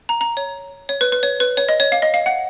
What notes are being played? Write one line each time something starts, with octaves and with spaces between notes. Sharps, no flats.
A#5
A#5
C#5
C#5
B4
B4
C#5
B4
C#5
D#5
C#5
F5
D#5
F5
F#5